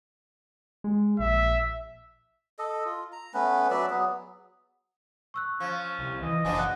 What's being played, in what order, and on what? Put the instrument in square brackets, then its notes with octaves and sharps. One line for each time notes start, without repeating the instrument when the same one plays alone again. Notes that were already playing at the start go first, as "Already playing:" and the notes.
[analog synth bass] G#3
[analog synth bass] A#1 [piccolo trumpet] E5
[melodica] A4 D#5
F4
A#5
A3 B3 C#4 B4
F#3 B4 D5 E5
F#3 B3 G#4
[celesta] C#6 E6 F#6
[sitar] F3 [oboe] C#4
[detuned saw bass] C2
[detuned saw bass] E3 [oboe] D#5
[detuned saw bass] F#1 [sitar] B2 F3 D4 [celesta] G#5
[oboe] F#5 [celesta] F#6